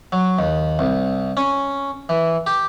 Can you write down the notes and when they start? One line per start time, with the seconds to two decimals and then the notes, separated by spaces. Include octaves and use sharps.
0.12 F#3
0.39 D#2
0.79 C2
1.37 C#4
2.09 E3
2.46 G4